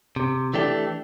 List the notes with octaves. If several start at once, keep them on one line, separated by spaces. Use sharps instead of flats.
C3
E3 A3 D4 G4